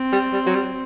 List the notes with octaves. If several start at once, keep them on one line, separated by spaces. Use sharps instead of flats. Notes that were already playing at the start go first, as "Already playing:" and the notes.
Already playing: C4
G3
G3
F#3
G3